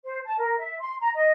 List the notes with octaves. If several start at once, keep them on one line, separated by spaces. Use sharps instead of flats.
C5
A5
A#4
E5
C6
A#5
D#5